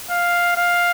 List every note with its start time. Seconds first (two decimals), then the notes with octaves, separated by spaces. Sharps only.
0.10 F5
0.57 F5